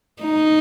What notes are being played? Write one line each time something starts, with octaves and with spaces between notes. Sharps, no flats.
D#4